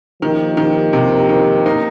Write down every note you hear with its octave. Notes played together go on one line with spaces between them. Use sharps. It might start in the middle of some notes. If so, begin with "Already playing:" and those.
D#3 F3 A#3 D#4 G4 A#4
D#3
C3
D#3
A#3 D#4